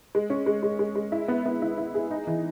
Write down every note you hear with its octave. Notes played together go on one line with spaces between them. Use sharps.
G#3
C#4
G#3
G#3
G#3
G#3
E4
B3
B3
E4
E4
G#4
D#4
E3